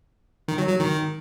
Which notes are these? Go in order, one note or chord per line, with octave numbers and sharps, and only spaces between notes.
D#3
F#3
F#3
D#3